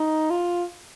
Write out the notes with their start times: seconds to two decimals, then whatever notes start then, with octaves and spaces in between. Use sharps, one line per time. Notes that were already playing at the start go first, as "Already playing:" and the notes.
Already playing: D#4
0.30 F4